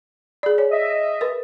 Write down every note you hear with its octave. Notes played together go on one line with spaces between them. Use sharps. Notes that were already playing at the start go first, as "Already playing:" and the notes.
G#4 D5
C#5
D#5 E5
A#4 B4